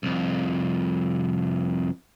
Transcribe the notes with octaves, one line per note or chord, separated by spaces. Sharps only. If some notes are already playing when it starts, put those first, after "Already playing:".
C2 F2